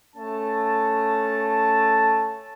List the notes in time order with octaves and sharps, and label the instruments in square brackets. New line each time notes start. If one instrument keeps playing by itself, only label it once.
[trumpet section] A3 C#4 A5